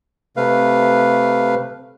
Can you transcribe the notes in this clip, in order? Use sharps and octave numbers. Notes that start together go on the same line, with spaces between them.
C3 A3 B4 F5